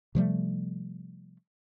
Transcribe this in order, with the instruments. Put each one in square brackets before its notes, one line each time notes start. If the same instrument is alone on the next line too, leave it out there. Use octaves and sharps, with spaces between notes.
[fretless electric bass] C3 F3 G3 A3